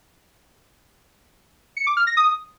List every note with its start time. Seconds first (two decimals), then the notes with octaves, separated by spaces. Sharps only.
1.77 C#7
1.87 D6
1.97 F6
2.07 A#6
2.17 D#6